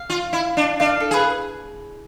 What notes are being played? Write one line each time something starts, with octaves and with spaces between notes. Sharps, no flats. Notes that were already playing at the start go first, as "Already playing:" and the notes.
Already playing: F5
F4
E4
D4
D4 F5
A4
G#4 B4